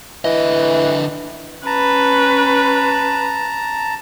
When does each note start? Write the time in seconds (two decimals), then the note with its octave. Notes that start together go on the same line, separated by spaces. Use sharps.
0.25 D3 E3 D#5
1.66 C#4 B4 A5 A#5